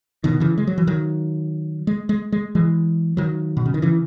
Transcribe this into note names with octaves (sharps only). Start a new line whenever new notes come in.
B2 D#3
C#3 E3
G#3
F#3
E3
D#3 F#3
G#3
G#3
G#3
E3 G#3
D#3 F#3
B2
C#3
D#3
C#3 E3